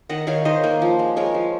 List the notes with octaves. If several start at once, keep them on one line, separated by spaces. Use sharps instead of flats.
D#3 D#5 F#5
D#3 C#5 F5
D#3 C5 D#5
A#3
F3
G#3
G#3 A#4 C#5
F3